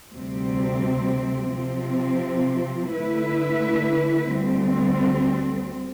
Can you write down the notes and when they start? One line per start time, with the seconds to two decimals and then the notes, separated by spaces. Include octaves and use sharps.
0.13 D2 C3 G3 C4
1.53 C3 F3 C4
2.92 D3 A3 E4 B4 E5
4.31 D2 D3 G3 C4